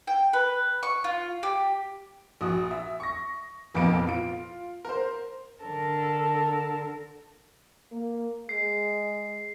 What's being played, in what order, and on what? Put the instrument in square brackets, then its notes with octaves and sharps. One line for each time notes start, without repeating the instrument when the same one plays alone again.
[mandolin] G5
B4
C#6
F4
G4
[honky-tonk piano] A#1 F#4 D#6
E5
C#6 A#6
F1 F2 A#2 A#3 B3 D7
F4 D7
A#4 C5
[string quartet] D3 A4 A#4 A5
[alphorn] A#3
[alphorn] G#3 [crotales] C7